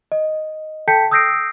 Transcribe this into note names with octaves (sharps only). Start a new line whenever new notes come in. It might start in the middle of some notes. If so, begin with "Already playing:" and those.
D#5
A4 G5 A5 G6 B6 C#7
D#6 E6 G6 A#6 C7 D7